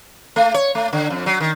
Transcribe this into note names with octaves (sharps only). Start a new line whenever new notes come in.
A3
C#5
A3
D3
F2
F#3
D#3